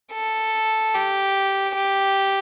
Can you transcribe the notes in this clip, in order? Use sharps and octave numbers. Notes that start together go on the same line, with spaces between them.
A4
G4
G4